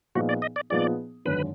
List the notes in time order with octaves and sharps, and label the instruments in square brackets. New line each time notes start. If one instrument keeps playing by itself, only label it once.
[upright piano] A#2 F3 B3 D#4 G#4 [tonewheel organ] F#4
[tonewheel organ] D5
D#5
D5
[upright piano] A#2 F3 B3 D#4 G#4 [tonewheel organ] D5
[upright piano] G#1 F#2 D3 [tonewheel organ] B4